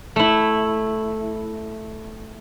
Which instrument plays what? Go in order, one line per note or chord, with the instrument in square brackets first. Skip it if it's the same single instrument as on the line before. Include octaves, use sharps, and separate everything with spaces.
[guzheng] A3 E4